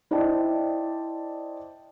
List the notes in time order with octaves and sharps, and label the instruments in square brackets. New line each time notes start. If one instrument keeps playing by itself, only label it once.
[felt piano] E4 C5 D5 D#5 G5 A5